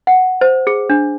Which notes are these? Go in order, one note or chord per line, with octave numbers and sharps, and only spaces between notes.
F#5
C5
G#4
D4